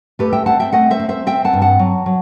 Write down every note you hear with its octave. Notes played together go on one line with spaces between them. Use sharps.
A3 G4 B4
E5 G5
C4 F#5 A5
E5 G5
A3 D#5 F#5
C5 E5
C4
C5 E5
C4 E5 G5
F#5 A5
G2
F#5 A5
F#3
F#3